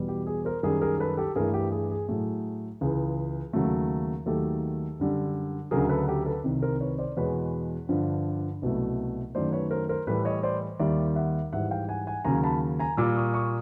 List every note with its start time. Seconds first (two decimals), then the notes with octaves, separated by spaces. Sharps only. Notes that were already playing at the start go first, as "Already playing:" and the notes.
Already playing: E2 B2 G3
0.08 G4
0.27 G#4
0.45 A#4 C5
0.63 F#2 D#3 G3 G#4 A#4
0.81 G#4 A#4
0.99 A4 B4
1.17 G4 A4
1.36 G2 E3 A3 G#4 A#4
1.54 G4
1.72 G#4
1.91 G#4
2.08 A2 F#3 A3 G#4
2.81 C#2 C#3 E3 G#4
3.53 D#2 C#3 F#3 A3
4.26 D#2 D#3 F#3 A3 G4 A4
5.00 F#2 D3 G3
5.71 D2 C#3 F#3 G#4 A#4
5.89 A4 B4
6.07 G4 A4
6.26 A4 B4
6.44 C2 C3 D#3
6.62 A#4 C5
6.81 B4 C#5
6.99 C5 D5
7.17 E2 B2 G#3 B4 C#5
7.89 G2 D3 F3
8.62 C2 B2 F#3 A3
9.35 F#2 D#3 F#3 A3 C5 D5
9.52 B4 C#5
9.71 A#4 C5
9.89 A#4 C5
10.07 A2 E3 G3 A4 B4
10.25 C#5 D#5
10.43 C5 D5
10.79 D#2 D#3 G3 D5 E5
11.16 E5 F#5
11.52 G#2 E3 G3 E5 F#5
11.71 F5 G5
11.89 F#5 G#5
12.07 F#5 G#5
12.25 D#2 C#3 F#3 G#5 A#5
12.44 A5 B5
12.79 G#5 A#5
12.97 A#2 G3 D6 E6
13.16 C#6 D#6
13.34 C#6 D#6